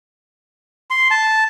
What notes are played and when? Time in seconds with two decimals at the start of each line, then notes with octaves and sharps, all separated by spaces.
0.90 C6
1.11 A5